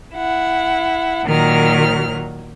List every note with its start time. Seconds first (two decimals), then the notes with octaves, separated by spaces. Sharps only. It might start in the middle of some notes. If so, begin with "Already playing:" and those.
0.15 E4 F#5
1.26 A#2 D#3 F#3 A#4 F6